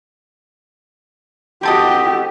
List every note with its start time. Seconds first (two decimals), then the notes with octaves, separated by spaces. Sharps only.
1.63 C4 F#4 G4 A4 D#5